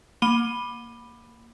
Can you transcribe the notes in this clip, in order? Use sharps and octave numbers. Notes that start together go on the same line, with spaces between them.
A#3 B5 D#7 G7